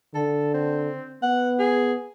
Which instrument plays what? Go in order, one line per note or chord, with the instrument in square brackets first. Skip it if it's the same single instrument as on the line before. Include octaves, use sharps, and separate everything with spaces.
[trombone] D3 [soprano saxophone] A4
[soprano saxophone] C4
[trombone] B3 [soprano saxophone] F#5
[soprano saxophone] G#4